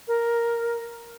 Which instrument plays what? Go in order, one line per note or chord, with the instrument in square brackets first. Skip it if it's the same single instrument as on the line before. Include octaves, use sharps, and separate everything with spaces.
[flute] A#4